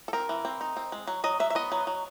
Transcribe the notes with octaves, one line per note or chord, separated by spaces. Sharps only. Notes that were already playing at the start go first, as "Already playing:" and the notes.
A4
C4 A#4
E3
C4
D#4
C4
G#3
F#3
F#3 D#5
F#3 E5
E5
B3 D#5
F#3
F#3